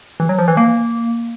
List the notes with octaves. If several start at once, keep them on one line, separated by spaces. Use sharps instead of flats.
E3
F#3
F3
E3
A#3